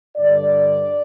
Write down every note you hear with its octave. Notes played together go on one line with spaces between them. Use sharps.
G2 D3 D5